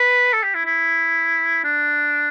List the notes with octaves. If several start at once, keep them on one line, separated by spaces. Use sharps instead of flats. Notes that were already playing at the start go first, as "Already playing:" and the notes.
Already playing: B4
A4
G4
E4
E4
D4